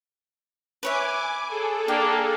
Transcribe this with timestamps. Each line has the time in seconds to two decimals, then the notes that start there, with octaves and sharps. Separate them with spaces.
0.83 B4 C#5 E5 G#5 D6
1.48 G#4 A4
1.88 A#3 D4 G5